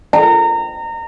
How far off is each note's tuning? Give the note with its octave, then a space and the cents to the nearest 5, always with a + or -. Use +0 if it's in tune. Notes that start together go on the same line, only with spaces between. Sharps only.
A#5 -25